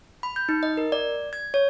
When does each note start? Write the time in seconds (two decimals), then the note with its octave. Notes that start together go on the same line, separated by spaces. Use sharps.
0.23 B5
0.36 G6
0.49 D#4
0.63 D#5
0.77 A#4
0.92 D5
1.33 G#6
1.54 C#5